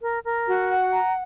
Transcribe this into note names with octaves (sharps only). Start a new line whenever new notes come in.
A#4
A#4
F#4
F#5
A#5